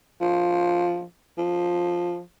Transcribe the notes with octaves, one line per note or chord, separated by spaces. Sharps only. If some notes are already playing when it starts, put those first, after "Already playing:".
F3
F3